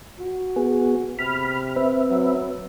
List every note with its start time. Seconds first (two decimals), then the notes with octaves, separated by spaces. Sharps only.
0.19 F#4
0.56 B3 G#4
1.19 C3 B5 F6
1.76 C4 B4 E5
2.10 F#3